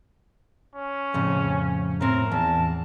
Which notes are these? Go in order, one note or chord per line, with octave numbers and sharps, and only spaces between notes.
C#4
F2 A2 C#3
A2 C4 A#4
E2 A5